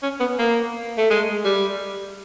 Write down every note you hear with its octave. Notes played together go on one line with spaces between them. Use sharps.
C#4
B3
A#3
A3
G#3
G3